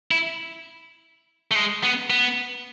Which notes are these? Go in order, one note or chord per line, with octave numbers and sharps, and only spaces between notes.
E4
A3
G#3
B3
B3